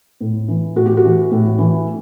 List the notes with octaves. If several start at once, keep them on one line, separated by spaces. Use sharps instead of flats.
A2
E3
A2 F#4
G4
F#4
E3
A2
E3